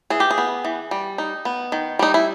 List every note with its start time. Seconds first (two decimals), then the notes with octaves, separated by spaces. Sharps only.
0.10 E3 G#4
0.20 G4
0.31 G#4
0.38 B3
0.65 E3
0.91 G3
1.18 D#4
1.45 B3
1.72 D#3
1.99 G3 D#4
2.14 E4